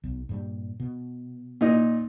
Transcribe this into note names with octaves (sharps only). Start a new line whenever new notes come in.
B1
G2 A#2 G3
B2
A#2 D#4